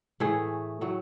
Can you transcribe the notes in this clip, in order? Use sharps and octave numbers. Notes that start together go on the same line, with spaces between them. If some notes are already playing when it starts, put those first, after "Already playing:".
A2 E3 A3 G#4
A2 F#3 A3